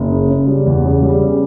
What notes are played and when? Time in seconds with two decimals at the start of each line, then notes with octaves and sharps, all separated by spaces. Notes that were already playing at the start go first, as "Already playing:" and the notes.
Already playing: F#1
0.12 C#3
0.29 C#3
0.47 G3
0.66 E2
0.84 C#3
1.02 G3
1.21 C#3